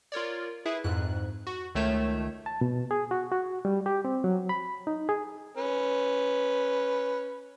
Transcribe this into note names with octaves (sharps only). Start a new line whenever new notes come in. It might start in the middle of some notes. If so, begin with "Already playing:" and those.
F4 A#4 C#5 D5
E4 G#4 B4 E5
F2 G#2 F#6
F#4
C#2 D#3 A3 C#5 G6 E7
A5
B2
G#4
F#4
F#4
G3
G4
C4
F#3
B5
D#4
G#4
C#4 B4